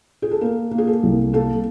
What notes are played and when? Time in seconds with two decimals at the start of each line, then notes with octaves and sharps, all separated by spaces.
0.22 G#4
0.31 A4
0.41 A#3 A#4
0.71 A#3
0.78 G#4
0.87 A4
1.03 C2
1.33 A#3 A4